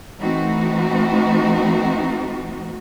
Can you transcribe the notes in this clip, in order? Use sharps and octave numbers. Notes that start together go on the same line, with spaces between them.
E3 A3 C4 D#4 F#4